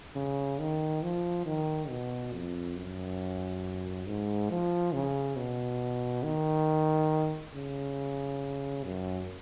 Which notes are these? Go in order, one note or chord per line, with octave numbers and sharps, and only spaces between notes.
C#3
D#3
F3
D#3
B2
F2
F#2
G#2
F3
C#3
B2
D#3
C#3
F#2